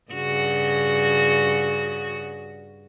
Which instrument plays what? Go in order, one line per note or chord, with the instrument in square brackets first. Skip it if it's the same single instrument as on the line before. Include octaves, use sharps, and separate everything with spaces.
[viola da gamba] G2 C#3 F#4